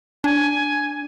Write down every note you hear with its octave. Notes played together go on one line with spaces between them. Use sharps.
D4 G#5